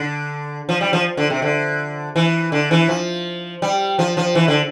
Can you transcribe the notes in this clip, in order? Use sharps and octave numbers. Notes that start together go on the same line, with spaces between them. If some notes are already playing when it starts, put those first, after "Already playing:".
Already playing: D3
F3
G3
F3
D3
C3
D3
E3
D3
E3
F3
G3
F3
F3
E3
D3